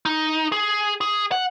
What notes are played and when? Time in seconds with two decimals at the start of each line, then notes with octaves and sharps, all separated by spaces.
0.05 D#4
0.52 G#4
1.01 G#4
1.32 F#5